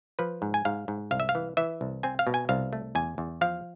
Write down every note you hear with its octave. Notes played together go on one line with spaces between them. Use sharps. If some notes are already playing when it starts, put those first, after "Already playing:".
F3 B4
G#2
G#5
G#2 F5
G#2
C2 F5
E5
F5
E3
E3 E5
C2
C4 G#5
F5
B2
G#5
C2 F5
A3
E2 G#5
E2
F3 F5